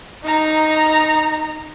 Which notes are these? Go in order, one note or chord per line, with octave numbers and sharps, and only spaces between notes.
D#4 A#5